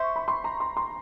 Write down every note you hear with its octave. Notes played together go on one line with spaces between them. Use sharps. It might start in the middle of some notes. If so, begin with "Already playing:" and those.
Already playing: C5 E5 C#6
B5
C6
A#5
C6
C6